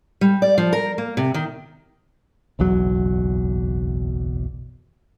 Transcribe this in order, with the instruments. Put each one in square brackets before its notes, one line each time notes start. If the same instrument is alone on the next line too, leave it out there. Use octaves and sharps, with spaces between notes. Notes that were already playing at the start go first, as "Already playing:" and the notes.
[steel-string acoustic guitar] G3
D5
F3
A#4
A#3
C3
D#3
[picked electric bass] F#1 B1 E2 F#3